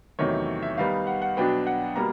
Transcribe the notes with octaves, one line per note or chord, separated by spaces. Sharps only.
E2 C3 D#3 F#3 A3 C#5
E5
D#3 G3 B3 D#4 F5
F#5
F#5
B2 F#3 B3 D4 G5
F#5
B2 G3 A#3 A#5